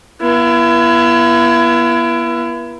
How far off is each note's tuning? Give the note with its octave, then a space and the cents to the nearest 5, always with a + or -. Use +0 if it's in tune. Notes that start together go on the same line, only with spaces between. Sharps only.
B3 -40 E4 +30